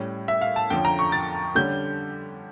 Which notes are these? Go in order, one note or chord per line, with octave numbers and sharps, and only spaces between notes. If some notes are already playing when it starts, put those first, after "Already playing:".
Already playing: A2 G3 C#4
E5
F5
A5
F2 D3 F3 C#4 G5
A#5
C#6
A6
D3 G3 C#4 G6